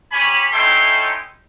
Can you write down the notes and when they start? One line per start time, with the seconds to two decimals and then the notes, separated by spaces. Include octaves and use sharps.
0.12 C#4 G4 G#5 B5
0.53 C#4 D#4 E4 A4 G5 C6